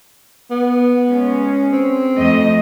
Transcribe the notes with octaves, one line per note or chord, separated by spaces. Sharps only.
B3
G#3 C#4
C4
F2 A3 D#5